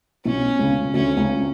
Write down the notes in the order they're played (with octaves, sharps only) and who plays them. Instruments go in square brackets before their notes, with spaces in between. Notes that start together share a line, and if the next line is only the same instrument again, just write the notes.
[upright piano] B1 B2 [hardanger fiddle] C#4
[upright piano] C#2 C#3
[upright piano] D2 D3 [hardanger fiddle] C#4
[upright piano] C#2 C#3